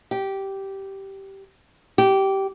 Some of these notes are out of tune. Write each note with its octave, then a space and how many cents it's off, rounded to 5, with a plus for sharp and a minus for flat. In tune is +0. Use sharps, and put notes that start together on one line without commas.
G4 -10
G4 -15